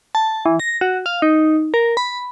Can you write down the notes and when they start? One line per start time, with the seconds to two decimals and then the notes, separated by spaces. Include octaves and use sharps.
0.15 A5
0.46 E3
0.60 A#6
0.81 F#4
1.06 F5
1.22 D#4
1.74 A#4
1.97 B5